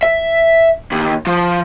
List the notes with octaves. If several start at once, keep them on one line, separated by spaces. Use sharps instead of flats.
E5
D#2
F3